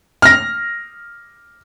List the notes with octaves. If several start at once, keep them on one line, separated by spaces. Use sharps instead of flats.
F6 A#6